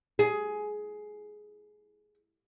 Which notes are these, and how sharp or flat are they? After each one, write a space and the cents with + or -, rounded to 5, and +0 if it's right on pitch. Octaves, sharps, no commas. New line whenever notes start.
G#4 +15